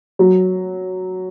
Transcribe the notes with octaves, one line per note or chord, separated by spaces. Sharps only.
F#3